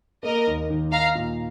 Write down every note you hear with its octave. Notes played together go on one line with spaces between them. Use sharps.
A#3 A#4 D#5
D#2
D#3
D#4 F5 A#5
A#2